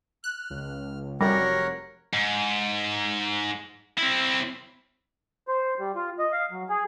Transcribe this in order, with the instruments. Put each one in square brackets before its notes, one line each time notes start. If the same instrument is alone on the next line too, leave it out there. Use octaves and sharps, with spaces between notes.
[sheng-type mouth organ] F6 [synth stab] F#6
[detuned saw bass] C#2
[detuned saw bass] F1 [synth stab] F#2 G3 [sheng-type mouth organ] A#4 C#5 F#5 [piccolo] A#6
[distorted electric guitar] G#2
C4 E4
[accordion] C5
G3
F4
D#5
F5
F#3
G#4